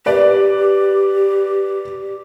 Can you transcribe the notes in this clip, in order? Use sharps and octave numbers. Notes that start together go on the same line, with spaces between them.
G4 B4 D5